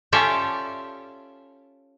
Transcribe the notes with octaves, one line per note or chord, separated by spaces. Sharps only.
C#4 F4 G4 A4 D5 E5